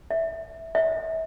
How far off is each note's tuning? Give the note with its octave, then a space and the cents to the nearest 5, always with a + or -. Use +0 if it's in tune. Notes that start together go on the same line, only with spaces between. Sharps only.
E5 -10
E5 -30